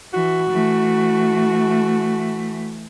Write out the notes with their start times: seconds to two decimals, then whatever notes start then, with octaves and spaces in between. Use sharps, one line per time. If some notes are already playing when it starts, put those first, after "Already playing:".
0.14 E3 F#4
0.51 E3 A3